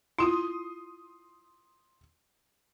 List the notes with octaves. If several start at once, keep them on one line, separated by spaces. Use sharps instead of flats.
E4 F4 C6 D#6